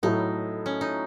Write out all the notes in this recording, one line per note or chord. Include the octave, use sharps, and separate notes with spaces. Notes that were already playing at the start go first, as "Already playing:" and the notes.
A2 F#3 A3 D#4 E4
C#4
D#4